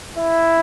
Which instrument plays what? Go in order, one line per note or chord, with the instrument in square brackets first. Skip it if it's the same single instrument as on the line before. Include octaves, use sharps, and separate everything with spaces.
[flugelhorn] E4